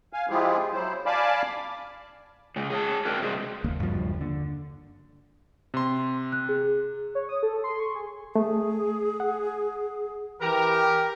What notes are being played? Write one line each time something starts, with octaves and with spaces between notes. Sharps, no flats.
F5 G#5
F3 G#3 E4 F4 G4 G#4
F#3 E4 C5
D5 F5 G#5 A5 B5 D6
C#3 G#3
G#4 C#5 A5
G#2 D3 C4 F#4 A#4
G2 C3 G#3
F#1 D#2 A#3
G2 F3
D3
C3 C6
F#6
G#4
C#5
D#6
A4
C6
C#6
G#4
A3 G#4
F#5
E3 G4 A#4